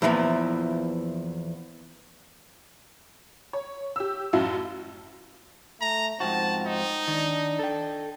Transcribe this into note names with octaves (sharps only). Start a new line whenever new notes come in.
E2 A#2 E3 F3
C#5
G4 E6
A1 F#2 E4 F#4 F5 A5
A3 A#5
G#2 F3 C4 F#4 A5
D#4
D#3 D4
A4 G5